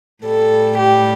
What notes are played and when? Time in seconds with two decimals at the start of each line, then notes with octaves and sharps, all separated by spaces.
0.24 A2 G3 A4
0.79 G4